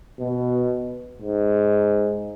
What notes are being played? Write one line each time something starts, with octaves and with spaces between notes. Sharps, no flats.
B2
G#2